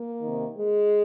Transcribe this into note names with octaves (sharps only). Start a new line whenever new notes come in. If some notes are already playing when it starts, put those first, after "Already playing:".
Already playing: A#3
C3 D#3
G#3